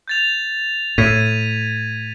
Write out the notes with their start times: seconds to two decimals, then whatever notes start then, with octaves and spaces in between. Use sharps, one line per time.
0.08 G6 A6 F7
0.98 A2 G#6 B6 D#7